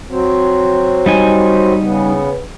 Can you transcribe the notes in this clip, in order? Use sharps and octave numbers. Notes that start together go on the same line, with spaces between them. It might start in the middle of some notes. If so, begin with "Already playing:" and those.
F#3 C4
G3 D#4 G#5
C#3 B3